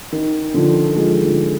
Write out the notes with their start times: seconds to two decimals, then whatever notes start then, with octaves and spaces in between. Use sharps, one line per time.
0.12 D#3
0.54 D3 F3
0.96 F3 G#3
1.19 D#3
1.25 D3 F3